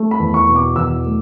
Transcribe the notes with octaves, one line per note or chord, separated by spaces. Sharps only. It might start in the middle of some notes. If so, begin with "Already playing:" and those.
Already playing: A3
B5
E2
C#6
B2
D6
E2 E6
A3